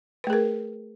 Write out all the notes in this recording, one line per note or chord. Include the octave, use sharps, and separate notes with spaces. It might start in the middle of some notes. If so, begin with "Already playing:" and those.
A3 G#4 A#4 B4